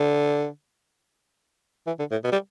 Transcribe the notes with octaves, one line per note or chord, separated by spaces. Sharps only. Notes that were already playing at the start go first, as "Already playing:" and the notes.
Already playing: D3
E3
D3
A2
B2
G3